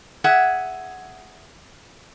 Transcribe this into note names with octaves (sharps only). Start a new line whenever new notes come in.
G#4 E5 F#5